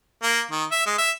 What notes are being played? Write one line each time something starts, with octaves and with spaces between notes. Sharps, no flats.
A#3
D#3
E5
G#3
E5